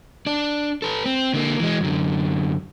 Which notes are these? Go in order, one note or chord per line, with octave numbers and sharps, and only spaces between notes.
D4 D5
A4 B4
C4
D3 A#3
E3 G#3
F#2 D3